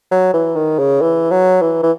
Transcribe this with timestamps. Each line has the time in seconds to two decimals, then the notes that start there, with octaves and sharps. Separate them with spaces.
0.11 F#3
0.34 E3
0.56 D#3
0.79 C#3
1.02 E3
1.31 F#3
1.61 E3
1.83 E3